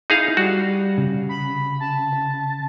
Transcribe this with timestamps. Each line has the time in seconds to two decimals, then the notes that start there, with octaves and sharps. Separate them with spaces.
0.10 D#4 E4 G#4 F5
0.37 G3 F#4
0.98 C#3
1.29 B5
1.80 A5